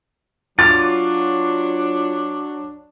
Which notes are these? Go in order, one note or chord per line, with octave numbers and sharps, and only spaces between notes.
F#3 D4 F4 D6 F6 A6